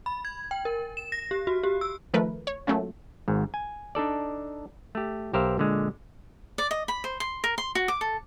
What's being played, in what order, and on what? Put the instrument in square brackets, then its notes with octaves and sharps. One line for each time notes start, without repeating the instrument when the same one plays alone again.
[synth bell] B5
G#6
G5
A#4
E7
A#6
G4
F#4
G4
E6
[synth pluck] D#3 F3 A3 A#4 B4
C#5
F#3 A3 A#3 C#4 F4
[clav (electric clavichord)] G#1 G#2
G#5
D4 D#4 A4 D5
A3 G4
B1 G4 A#4 C5 E5 F5
A#2 D3 G#3
[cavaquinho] D5
D#5
B5
C5
C6
A#4
C6
F#4
D6
A4